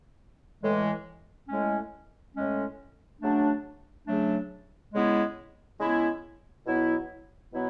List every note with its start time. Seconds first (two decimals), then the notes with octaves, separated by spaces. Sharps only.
0.62 A2 E3 G#3
1.49 A2 G#3 C#4
2.35 A2 G#3 C#4
3.21 C#3 F#3 A3 D4
4.07 C#3 F#3 A3 D4
4.93 C#3 G#3 B3 E4
5.79 C#3 G#3 B3 E4
6.66 B2 F#3 B3 E4
7.51 B2 F#3 B3 E4